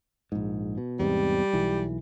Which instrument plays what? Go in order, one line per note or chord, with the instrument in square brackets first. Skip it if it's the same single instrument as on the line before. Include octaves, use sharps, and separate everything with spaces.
[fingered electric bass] A#1 G#2
B2
[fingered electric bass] E2 G#2 C3 [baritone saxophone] G3
[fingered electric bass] B1 E3